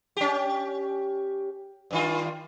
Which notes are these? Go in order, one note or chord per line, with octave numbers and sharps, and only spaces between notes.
C#4 G4
G2 D#3 F4